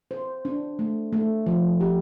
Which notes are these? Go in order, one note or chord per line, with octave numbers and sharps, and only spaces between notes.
C5
D4
A3
A3
F3
G4